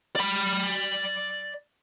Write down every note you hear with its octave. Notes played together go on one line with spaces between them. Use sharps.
D5 B5